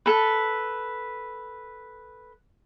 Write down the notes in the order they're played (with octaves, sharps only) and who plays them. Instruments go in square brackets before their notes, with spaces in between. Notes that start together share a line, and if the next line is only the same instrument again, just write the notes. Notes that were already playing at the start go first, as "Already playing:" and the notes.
[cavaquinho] A4 B4